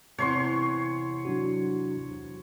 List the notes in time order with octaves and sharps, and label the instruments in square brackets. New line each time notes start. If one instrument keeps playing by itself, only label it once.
[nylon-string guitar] E2 C3 [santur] C#5 C6 C#6
[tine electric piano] F#3 D4 F#4